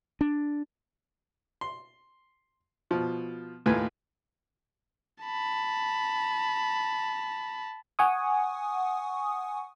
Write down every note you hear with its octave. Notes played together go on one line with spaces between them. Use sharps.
D4
C6
B2 F3
D#2 A2 F4 B4 G#5
A5 B5
F#5 G#5 C#6 D#6